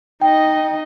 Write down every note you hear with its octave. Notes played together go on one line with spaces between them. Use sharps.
D#4 D#5 G5